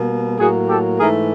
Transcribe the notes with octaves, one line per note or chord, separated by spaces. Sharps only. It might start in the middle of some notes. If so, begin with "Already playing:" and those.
Already playing: B2 G3 A#3
A2 F#3 A#3 F#4 G#4
G4 A4
G#2 E3 A3 G#4 A#4